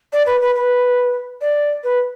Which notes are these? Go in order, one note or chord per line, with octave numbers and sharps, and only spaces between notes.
D5
B4
B4
B4
D5
B4